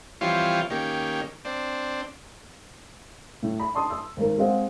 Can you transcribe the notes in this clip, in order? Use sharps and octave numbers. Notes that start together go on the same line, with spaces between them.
E3 F3 G3 C4 F4 C#5
D#3 A#3 C#4 G4
C4 D4
A2
B5
A5 C6 D#6
E6
G#1 A#4
G#3 C4 G#4 C5 F5 F#5